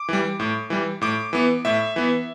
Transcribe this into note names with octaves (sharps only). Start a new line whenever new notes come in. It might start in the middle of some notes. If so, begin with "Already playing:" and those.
Already playing: D6
E3 G3
A2
E3 G3
A2 D6
E3 B3
A2 E5
E3 B3